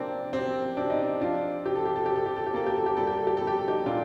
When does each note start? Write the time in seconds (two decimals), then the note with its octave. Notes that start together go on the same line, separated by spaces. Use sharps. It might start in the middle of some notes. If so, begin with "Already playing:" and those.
Already playing: C3 A#3 C4 D4
0.33 C3 C4
0.77 C3 D4
0.90 D#4
1.03 D4
1.21 F3 D4 F4
1.65 C3 G4
1.75 A4
1.85 G4
1.96 A4
2.06 C3 G4
2.16 A4
2.26 G4
2.36 A4
2.46 G4
2.54 A#3 A4
2.66 G4
2.76 A4
2.86 G4
2.97 G3 A4
3.07 G4
3.17 A4
3.27 G4
3.37 G3 A4
3.47 G4
3.58 A4
3.68 D#4 G4
3.86 A#2 D4 F4